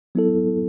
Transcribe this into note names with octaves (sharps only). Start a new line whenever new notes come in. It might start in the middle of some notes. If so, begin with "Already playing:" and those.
F#3 B3 E4 A4